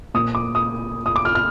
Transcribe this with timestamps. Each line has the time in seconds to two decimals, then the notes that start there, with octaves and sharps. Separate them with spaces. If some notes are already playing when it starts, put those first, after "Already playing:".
0.14 A#2 F3 D#6
0.35 D6
0.55 D#6
1.06 D#6
1.16 D6
1.25 F6
1.35 F6